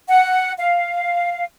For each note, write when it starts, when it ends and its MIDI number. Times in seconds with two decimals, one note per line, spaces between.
0.08 0.53 78
0.58 1.43 77